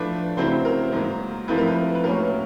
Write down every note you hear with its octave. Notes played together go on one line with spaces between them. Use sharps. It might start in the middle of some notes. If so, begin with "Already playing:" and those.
Already playing: A2 F3 A3 D4 B4
C#3 F#3 A3 C4 E4 C5
A#4
G#2 D#3 F#3 A#3
G#2 F3 A3 C4 E4 B4
A#4
B4
B4
A2 F#3 A#3 C#4 A#4